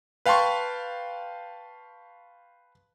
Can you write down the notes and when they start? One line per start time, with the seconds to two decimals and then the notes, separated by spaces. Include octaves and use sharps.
0.26 B4 F5 G5 A5 C6 C#6